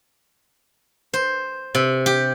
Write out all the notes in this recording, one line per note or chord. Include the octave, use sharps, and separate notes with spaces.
C5
C3
G4